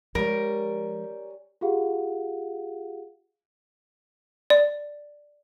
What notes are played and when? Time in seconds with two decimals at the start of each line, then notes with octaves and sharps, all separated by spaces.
0.15 F3 G3 G#3 C#4 A#4
1.61 F4 G4 G#4 F5 F#5
4.50 D5